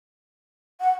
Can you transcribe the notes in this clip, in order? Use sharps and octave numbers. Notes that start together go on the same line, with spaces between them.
F#5